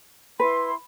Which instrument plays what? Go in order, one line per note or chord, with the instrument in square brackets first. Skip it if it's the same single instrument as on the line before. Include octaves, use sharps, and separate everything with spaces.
[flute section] E4 C6 [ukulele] B4